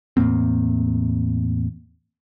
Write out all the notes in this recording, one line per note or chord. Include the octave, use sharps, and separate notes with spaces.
E2 A2 A#3 C4